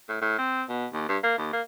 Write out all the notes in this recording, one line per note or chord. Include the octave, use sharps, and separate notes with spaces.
A2
A2
C4
B2
D#2
G2
A#3
D#2
A#3